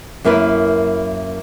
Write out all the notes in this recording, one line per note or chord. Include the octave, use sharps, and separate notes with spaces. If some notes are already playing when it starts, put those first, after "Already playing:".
F#2 A#3 E4 A#4 B4